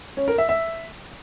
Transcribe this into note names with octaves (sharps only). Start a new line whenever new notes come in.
C#4
A#4
E5
E5